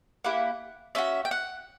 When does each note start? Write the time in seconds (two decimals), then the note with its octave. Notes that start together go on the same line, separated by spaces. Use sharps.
0.24 A#3 E4 G4 F#5
0.95 C#4 F#4 E5
1.25 G5
1.31 F#5